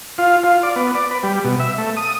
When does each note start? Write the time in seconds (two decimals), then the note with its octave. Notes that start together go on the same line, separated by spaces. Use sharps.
0.18 F4
0.44 F4
0.63 D5
0.76 B3
0.95 D5
1.11 B4
1.23 G3
1.44 B2
1.60 E5
1.78 A3
1.97 D#6